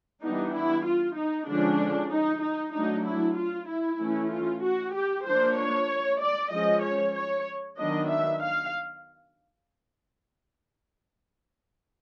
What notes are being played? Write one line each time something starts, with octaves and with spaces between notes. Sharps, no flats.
E3 G3 B3 D4 D#4
E4
F4
D#4
D3 F3 G#3 C#4 D4
D#4
D#4
F#3 A3 D4 D#4
E4
F4
E4
E3 A3 C#4
F4
F#4
G4
F3 A#3 D4 C5
C#5
D5
F3 G#3 C#4 D#5
C#5
C#5
D#3 F#3 B3 D4 D#5
E5
F5